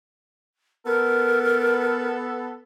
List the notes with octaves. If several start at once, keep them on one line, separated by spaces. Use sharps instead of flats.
B3 A4 A#4